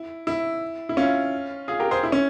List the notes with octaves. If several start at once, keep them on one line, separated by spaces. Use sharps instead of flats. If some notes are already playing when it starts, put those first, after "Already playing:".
Already playing: E4
E4
E4
C#4 F4
F4 G#4
G4 A#4
G#4 C5
E4
C#4